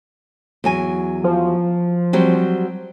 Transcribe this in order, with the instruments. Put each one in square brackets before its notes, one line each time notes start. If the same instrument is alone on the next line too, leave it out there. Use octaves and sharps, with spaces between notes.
[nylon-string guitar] E2 F#3 G#5
[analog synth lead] F3
[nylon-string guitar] F#3 G3 C4